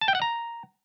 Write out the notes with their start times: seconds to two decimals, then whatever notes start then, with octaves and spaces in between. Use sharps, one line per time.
0.01 A5
0.08 G5
0.15 F#5
0.22 A#5